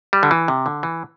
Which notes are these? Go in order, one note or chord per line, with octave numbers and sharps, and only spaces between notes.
G3
D3
E3
C3
D3
E3